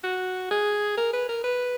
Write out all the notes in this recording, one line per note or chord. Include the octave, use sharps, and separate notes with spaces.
F#4
G#4
A#4
B4
A#4
B4